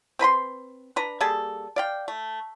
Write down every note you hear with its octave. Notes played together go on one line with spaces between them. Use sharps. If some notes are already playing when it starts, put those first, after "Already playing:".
C4 B4 B5 C6
D4 B4 A#5
G3 A#3 G#4 A4
D5 F5 G5
A3